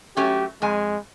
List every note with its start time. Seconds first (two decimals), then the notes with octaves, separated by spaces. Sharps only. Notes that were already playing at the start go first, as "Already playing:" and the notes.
0.17 F#3 A3 C#4 G4
0.62 F2 G#3 G#5